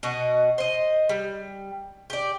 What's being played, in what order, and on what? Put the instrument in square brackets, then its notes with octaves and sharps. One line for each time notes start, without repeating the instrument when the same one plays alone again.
[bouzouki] B2 F#4 D#5
C5 D#5
G3
G4 D5